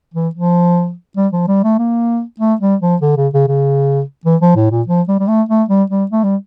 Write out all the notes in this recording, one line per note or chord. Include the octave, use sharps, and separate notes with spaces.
E3
F3
G3
F3
G3
A3
A#3
A3
G3
F3
D3
C#3
C#3
C#3
E3
F3
A2
A#2
F3
G3
G3
A3
A3
G3
G3
A3
G3